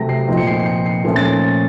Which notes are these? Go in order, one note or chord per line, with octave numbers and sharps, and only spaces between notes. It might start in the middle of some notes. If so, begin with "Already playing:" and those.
Already playing: C3 F#3 A3 A#6
C7
A#2 F3 C4 D#4
C#7
C7
C7
C#7
C7
A#2 F3 A3 C#4
A6